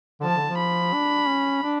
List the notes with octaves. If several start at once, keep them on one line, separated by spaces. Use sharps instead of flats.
D3
F3 A5
D3
F3
B5
D4
C#4
D4